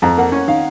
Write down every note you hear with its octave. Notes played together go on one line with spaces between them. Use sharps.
F2 A#5
A#3 F#5
C#4
D#3 F5